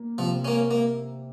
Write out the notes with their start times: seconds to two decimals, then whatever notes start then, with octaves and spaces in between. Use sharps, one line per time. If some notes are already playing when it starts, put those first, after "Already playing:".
Already playing: A#3
0.18 C3 F3
0.45 A#3 C#4
0.71 A#3